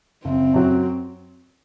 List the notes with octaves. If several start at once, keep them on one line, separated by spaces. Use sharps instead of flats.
F#1 C4
F#2 F#3